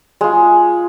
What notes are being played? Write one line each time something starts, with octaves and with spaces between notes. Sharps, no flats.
G#3 F4